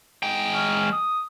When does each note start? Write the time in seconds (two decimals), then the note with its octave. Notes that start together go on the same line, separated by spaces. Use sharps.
0.23 G#3 G5
0.54 C#4
0.92 D#6